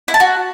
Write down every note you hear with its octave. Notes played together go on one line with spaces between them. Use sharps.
E4
A5
F#4